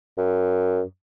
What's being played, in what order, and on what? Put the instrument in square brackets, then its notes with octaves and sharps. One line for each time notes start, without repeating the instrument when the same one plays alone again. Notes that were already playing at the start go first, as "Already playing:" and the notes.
[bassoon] F#2